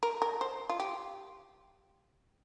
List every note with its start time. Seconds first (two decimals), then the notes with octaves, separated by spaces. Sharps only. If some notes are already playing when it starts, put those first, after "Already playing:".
0.03 A#4
0.22 A#4
0.41 C5
0.69 F4
0.80 G4